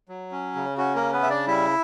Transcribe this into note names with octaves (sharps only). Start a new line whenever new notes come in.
F#3
C#4
C#3
C#4 F#4
A#3 A#4
C#3
B3 B4
C#3 E5
D4 D5
G3 E4 E5